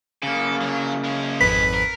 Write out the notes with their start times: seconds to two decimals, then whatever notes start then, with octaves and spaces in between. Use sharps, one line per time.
0.23 C#3 A#3 A4
0.61 F#3
1.04 G#3 C#4
1.41 G#1 F2 B4 B6
1.74 A#4